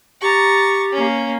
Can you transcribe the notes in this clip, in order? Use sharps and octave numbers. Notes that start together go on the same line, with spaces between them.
G4 A#5 C#6 A6
A#3 C#4